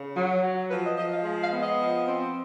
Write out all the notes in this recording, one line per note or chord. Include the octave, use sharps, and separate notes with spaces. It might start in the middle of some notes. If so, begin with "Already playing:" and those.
Already playing: C#3
F#3
F#3
F3 B4
D#5
F3 D#5
F5
G#3
F5
B3
D#5
F3
C4